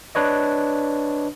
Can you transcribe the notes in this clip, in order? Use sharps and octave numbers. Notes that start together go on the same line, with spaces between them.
D4 B4 C#5 D#5